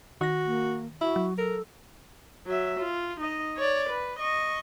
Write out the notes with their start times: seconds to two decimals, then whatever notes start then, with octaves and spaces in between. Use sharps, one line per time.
0.21 D#3 F#4 A#6
0.46 A#3
1.01 E4 F#4
1.16 F#3
1.38 A4 A#4
2.46 F#3 E5
2.80 F4
3.21 D#4 D#5
3.57 C#5 D5
3.90 B4
4.19 D#5 C#6